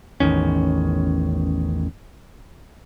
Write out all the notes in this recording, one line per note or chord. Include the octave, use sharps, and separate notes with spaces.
A1 E2 D#3 C#4